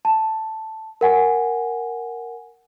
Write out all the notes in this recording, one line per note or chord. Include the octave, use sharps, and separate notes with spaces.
A5
A#4 F#5 G#5